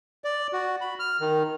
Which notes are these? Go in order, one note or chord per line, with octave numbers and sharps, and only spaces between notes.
D5
F#4
B5
F6
D#3